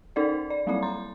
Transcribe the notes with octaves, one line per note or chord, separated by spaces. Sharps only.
C#4 D#4 A4 A#4 D5
D5
F#3 G3 A#3 C4 E4 D5
A#5 C6